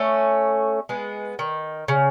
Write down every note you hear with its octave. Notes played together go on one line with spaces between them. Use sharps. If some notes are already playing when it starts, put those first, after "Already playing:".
Already playing: A3 C#4
G#3 B3
D#3
C#3